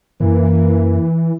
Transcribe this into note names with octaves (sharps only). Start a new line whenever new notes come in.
F#2 E3 A#3